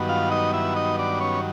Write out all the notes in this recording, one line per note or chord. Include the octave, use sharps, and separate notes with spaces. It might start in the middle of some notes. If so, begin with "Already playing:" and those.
Already playing: G2 D#3 F#3 B3
F4 F5
D#4 D#5
E4 E5
D#4 D#5
D4 D5
C#4 C#5